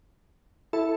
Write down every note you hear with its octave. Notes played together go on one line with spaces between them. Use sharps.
E4 A4